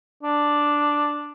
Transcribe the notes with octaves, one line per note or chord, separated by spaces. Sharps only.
D4